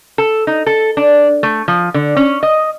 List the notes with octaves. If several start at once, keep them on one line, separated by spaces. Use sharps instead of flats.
A4
D#4
A4
D4
A3
F3
D3
C#4
D#5